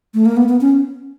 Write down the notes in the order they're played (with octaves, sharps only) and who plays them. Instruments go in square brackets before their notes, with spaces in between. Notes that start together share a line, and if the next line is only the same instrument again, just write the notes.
[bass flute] A3
A#3
B3
B3
C#4